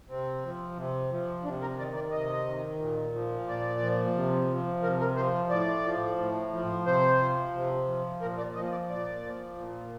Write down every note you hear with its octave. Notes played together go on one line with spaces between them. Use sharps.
C3 C4
F3
C3
F3
C3 D4
A#4
D#3 D5
D5
C3 D#5
D#3
A#2
F3
A#2 D5
F3
C3
F3
C3 A#4
A#4
F3 C5
A2 D5
F3
A2
F3
C3 C5
F3
C3
F3
A#2 A#4
D5
F3 D#5
D5
A#2 D5
F3
A#2